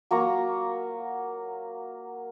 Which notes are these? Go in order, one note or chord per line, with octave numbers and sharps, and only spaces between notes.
F#3 A#3 A#5 C#6